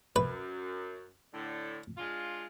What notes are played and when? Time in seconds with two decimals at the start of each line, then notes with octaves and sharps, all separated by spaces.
0.16 F#2 B4
1.34 A2 D3
1.97 G#3 D4 F4